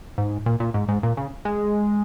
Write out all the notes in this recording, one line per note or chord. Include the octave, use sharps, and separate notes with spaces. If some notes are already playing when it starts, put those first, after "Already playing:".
G#2
A#2
A#2
G#2
G#2
A#2
C#3
G#3